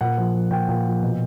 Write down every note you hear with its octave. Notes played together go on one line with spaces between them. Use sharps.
A#2 F#5
F3
F3
A#2 G5
A#2
F3
B2